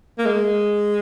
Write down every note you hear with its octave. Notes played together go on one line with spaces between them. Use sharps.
A#3
G#3